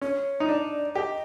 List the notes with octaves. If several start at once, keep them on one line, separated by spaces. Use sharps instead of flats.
C#4 C#5
D#4
D4 D5
G4 D#5